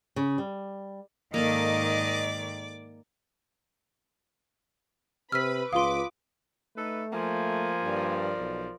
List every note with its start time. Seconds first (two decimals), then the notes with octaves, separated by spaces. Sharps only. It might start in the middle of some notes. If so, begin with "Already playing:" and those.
0.16 C#3
0.38 G3
1.34 G#2 D#3 A#3 A4 D5 D#5 D6
5.32 C3 B4 B5 E6 F6 B6
5.73 C#2 F4 B4 F5 C6 D6 D#6
6.77 A3 D#4 A4 B4
7.13 F3 A#3 G#5
7.84 G2 A#4 D5
8.39 B1